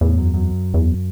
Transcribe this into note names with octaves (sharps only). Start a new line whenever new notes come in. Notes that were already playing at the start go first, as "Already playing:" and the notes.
E2 A2
F#2
F#2
E2